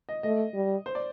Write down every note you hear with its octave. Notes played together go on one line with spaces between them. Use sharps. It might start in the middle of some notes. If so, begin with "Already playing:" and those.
D#5
A3 D#5
G3
C5
D5